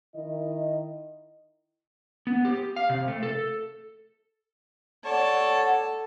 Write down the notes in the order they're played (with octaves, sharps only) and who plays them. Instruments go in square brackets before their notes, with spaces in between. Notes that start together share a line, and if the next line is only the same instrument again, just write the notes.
[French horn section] D#3 E4 D#5
[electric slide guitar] B3
G4
F5
C3
A3
A4
[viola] A4 A5 [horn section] C#5 D5 [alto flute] F#5